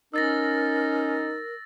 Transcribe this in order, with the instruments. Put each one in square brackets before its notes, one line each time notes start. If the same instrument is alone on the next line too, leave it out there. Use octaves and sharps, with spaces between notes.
[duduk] C#4 [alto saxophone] D#4 [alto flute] A#4 [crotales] E6 A6 A#6